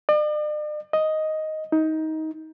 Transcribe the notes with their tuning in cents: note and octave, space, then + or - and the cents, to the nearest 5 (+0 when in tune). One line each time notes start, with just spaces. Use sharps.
D5 +45
D#5 +5
D#4 +20